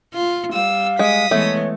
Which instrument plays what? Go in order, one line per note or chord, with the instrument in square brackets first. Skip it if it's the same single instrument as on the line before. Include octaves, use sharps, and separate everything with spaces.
[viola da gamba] F4
[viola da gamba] G3 [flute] F5 [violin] E6
[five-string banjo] G#3 [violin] D#6 B6
[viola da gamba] E3 G#3 B3 [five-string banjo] A3 [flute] C#5